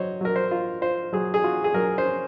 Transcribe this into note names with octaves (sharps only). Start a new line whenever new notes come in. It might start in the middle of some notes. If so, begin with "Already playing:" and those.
Already playing: F#3 C5 C#5 D#5
F#3 A#4
C5
F4
F4 C5
F#3 G#4
G#4
F4 F#4
G#4
F#3 A#4
C5
C#4